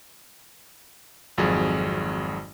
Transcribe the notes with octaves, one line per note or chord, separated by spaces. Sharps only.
G#1 F2 F#3 G#4